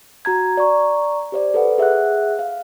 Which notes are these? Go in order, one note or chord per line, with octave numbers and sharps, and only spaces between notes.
F#4 A#5 G#6
D5 A#5 C#6
G4 C5 D5
A4 B4 F#5
G#4 E5 F#5 F#6
F5